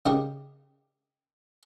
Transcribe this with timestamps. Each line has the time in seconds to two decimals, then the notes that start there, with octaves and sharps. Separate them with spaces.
0.06 C#3 D#4 G4 A#4